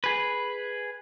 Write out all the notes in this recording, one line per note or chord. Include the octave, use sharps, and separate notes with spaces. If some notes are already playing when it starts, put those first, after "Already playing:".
G#4 B4